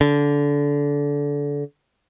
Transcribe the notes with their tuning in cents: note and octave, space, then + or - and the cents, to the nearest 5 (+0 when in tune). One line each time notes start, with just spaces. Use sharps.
D3 -25